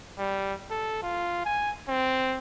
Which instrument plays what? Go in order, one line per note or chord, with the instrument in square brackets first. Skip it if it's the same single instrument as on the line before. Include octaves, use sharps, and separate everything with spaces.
[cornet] G3
A4
F4
G#5
C4